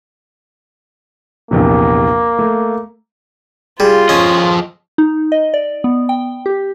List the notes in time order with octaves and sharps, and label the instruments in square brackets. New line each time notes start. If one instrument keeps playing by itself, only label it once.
[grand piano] A#1 E2 C3 [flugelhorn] A#3
[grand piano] A3
[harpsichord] G3 [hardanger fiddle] F4 [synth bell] G#4
[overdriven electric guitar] F3 D#5 [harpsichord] C#4
[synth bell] D#4
D#5
D5
B3
G5
G4